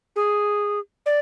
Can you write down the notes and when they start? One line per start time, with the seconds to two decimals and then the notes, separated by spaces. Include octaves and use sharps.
0.16 G#4
1.06 D5